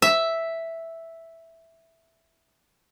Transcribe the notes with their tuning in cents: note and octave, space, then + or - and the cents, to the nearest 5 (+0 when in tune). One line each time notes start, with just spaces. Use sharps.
E5 +0